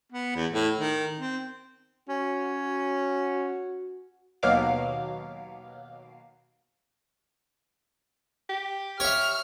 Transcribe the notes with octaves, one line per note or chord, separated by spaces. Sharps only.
B3
E2
A2
D#3
C4
C#4 F#4
D#2 B2 F#3 F5 D6
G4
G4 C#5 E5 F6